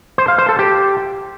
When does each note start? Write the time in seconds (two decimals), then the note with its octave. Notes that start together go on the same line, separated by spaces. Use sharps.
0.18 C5
0.28 F5
0.38 C5
0.49 A4
0.59 G4